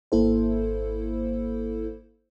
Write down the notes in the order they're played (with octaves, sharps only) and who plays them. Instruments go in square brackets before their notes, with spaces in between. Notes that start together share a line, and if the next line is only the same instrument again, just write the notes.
[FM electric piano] G#1 A#3 E4 A4 C5